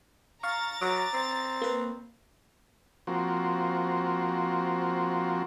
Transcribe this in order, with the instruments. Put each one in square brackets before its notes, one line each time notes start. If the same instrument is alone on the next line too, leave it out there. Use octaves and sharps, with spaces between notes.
[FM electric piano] F5 C#6 [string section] A#5 A6
[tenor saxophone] F#3 [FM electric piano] D6
[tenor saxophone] C4
[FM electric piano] A#3 B4
[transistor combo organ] F3 A#3 C4 F#4